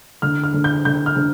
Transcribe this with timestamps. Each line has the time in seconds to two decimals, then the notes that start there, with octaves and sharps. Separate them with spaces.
0.22 D3 F6
0.44 F6
0.54 D3
0.64 G6
0.85 D3 G6
1.06 F6
1.16 D3